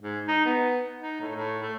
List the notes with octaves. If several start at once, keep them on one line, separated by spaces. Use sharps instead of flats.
G#2
D#4
B3
D#4
A2
A2
A3